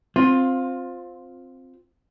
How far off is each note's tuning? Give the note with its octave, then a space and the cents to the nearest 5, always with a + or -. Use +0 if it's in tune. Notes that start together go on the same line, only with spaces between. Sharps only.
C4 +0 F4 +15